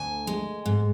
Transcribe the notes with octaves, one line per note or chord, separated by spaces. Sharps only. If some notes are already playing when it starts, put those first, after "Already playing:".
Already playing: D2 G#5
G#3
G#2